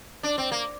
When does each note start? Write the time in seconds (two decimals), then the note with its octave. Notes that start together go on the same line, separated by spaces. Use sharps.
0.23 D4
0.38 C4
0.52 A#3